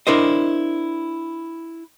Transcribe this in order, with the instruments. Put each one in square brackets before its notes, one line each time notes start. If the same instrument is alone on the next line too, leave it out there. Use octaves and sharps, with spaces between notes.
[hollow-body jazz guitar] D4 E4 A#4 C5 D#5